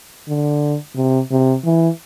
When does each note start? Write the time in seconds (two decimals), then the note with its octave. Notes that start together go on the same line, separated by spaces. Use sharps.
0.28 D3
0.96 C3
1.31 C3
1.65 E3